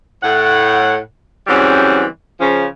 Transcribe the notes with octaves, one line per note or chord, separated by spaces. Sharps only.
A2 F#5
C#3 E3 F#3 G3 C4 C#4
C#3 F3 C#4